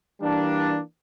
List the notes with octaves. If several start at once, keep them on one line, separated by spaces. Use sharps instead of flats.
E3 G3 A#3 D4